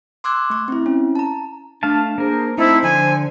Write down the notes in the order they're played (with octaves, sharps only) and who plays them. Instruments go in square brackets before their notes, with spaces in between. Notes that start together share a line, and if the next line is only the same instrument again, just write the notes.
[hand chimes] C6 D6 E6 F#6 G#6
A3 C#6
C4 E4
C#4
A5 A#5
[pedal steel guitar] A3 F5 A5 [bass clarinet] D4
[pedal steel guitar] A#3 A#4 [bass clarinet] D4 [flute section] G#4 C5
[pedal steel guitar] A3 D#4 A4 [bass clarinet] C4 [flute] E4 [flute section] C5
[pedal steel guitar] D3 [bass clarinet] F3 [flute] G#5